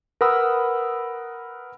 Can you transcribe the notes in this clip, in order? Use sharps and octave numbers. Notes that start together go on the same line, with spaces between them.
A#4 B4 F#5 B5 D#6 E6